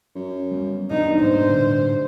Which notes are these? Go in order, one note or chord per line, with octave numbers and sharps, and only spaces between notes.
F#2
G3 B3
E1 G2 B3 C#4 D#4
G#2 B2 A#3 C5
A2 D3 F#3